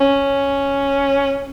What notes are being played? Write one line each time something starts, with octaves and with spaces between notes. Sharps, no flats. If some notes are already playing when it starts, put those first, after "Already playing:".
C#4